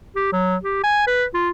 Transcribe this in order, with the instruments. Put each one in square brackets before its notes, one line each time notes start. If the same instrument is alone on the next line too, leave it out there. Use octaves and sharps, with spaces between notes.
[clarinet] G4
F#3
G4
G#5
B4
F4